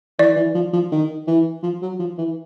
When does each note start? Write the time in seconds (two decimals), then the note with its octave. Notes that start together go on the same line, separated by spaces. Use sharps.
0.19 E3 D5
0.36 E3
0.55 F3
0.73 F3
0.92 D#3
1.27 E3
1.63 F3
1.82 F#3
1.99 F3
2.18 E3